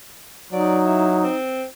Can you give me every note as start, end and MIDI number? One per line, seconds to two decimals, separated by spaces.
0.52 1.29 54
0.52 1.37 63
0.52 0.79 74
0.86 1.17 64
1.22 1.64 60